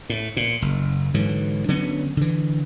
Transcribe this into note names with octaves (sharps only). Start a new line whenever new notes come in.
A2
A#2
F#1
G#2 D3 E3 F#3
D3 F#3 B3 C#4
D3 E3